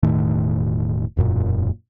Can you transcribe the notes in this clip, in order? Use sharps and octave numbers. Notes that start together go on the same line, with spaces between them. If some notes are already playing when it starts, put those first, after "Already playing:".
E1 A2 D#3 A3
E1 F#2 A#2